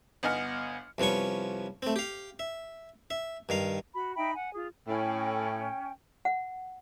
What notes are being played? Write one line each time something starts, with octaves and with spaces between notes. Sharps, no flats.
G1 B3 D#5 G#5 F6 C#7
C2 F3 B3 C#4 C#6
A3 C4
G4 F5
E5
E5
G2 D#3 F5
F#4 B5
D#4 E5 G5 B5
F#5 G#5
F4 G#4
A2 C#4 G5
F#5